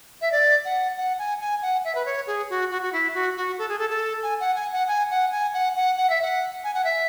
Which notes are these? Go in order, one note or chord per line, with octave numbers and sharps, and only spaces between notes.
E5
D5
F#5
F#5
G#5
G#5
F#5
E5
B4
C#5
G#4
F#4
F#4
F#4
E4
F#4
F#4
A4
G#4
A4
A4
G#5
F#5
G#5
F#5
G#5
F#5
G#5
F#5
F#5
F#5
E5
F#5
G#5
F#5
E5